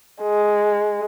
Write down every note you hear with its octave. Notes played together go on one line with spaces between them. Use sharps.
G#3